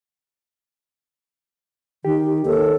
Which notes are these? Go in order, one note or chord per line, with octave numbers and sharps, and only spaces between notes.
D#3 G4
D#2 A4